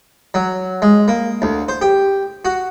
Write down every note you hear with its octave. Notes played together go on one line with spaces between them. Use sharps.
F#3
G#3
A#3
D2
C5
G4
F#4